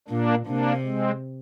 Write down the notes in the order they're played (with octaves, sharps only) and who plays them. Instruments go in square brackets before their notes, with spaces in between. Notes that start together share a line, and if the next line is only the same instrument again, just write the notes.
[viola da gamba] A#2 [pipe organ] A#3 D4
[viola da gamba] C3 [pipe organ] A#3 D4
[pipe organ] G#3 C4